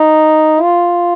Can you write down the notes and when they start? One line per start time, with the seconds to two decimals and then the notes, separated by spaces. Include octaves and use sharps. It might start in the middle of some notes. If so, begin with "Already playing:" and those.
Already playing: D#4
0.62 F4